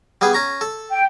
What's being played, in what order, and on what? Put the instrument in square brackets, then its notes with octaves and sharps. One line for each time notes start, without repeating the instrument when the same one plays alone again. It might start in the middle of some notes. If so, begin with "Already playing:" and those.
[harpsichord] G3 B3 G#4
C#4 A#5 C#6
A4
[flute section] G5